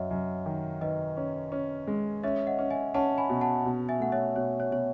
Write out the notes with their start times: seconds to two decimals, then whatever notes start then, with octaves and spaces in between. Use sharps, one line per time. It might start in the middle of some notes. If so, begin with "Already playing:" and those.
Already playing: F#2 C#5 D#5 E5 F#5
0.11 F#2
0.46 D#3
0.81 D#3 B4 D#5
1.17 C#4
1.52 C#4
1.87 G#3
2.23 C#4 C#5 E5
2.47 D#5 F#5
2.59 C#4
2.71 E5 G#5
2.94 C#4 F#5 A5
3.18 G#5 B5
3.29 B2
3.41 F#5 A5
3.66 B2
3.89 E5 G#5
4.00 A3 F#5
4.12 C#5 E5
4.36 B2 C#5
4.60 C#5
4.71 B2 C#5